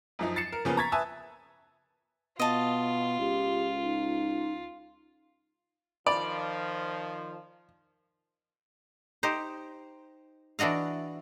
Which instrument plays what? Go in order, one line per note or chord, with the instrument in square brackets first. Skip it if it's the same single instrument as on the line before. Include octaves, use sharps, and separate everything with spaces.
[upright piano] F#2 F3 D#4
A6 C7 C#7 E7
A#4
C#3 F3 A#3 B3 C#4
A#5 C#6 G#6 A6 B6
B4 E5 G#5 A5 D#6 E6
[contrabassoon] B2 [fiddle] F4 [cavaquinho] D#5 A5
[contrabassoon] C#2 [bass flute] G4
[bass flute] D#4
[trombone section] D#3 F3 [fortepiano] D5 [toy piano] B5
[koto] D#4 G4 C5
E3 D4 F#4 D#5 F5